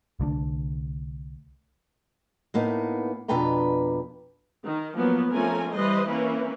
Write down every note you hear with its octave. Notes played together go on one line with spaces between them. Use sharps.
C2 D3 A3 D4
A2 A#3 B3 D#4
F2 B2 D4 B4 G5 A#5
D#3
F3 F#3 A#3 B3
F3 A3 C4 C#4 A#4 G#5
E3 G3 B4 C5 D#5
E3 A#3 C4 C#4 E4 B4